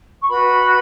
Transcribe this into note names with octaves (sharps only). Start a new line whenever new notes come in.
C#6
F#4 B4 B5